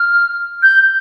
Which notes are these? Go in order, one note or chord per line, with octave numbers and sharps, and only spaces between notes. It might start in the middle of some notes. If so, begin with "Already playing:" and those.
Already playing: F6
G6